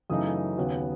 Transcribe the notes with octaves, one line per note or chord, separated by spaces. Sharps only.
F#2 C#3 E3 A3 D#4 D#6
D#2 C#3 F#3 B3